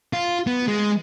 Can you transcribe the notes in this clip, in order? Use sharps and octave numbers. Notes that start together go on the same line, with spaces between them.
F4
B3
G#3